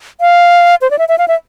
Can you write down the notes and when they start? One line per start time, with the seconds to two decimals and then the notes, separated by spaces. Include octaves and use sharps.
0.21 F5
0.82 C5
0.91 D5
0.99 E5
1.09 E5
1.18 F5
1.28 E5